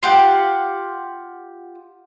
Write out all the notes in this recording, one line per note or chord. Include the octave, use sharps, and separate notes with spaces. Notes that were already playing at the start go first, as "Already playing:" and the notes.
F4 G4 F#5